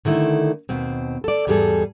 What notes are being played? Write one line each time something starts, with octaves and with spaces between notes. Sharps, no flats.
D3 D#3 A3 E4
D#2 B2 C4
A4 D5
E2 G#2 G3 D4 G#4 A4